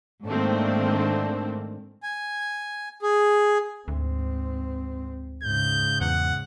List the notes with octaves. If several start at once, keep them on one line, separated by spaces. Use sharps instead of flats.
G#2 D#3 A3 A#3 C4 D4
G#5
G#4
D2 G#2 C4
G#2 C#3 G6
E2 F#5